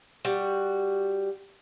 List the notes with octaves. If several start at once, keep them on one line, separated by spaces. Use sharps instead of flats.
G3 F#4